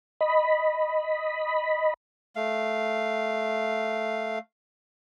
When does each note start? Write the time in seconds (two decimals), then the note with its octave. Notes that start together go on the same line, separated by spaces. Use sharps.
0.21 D#5 B5
2.36 A3 F5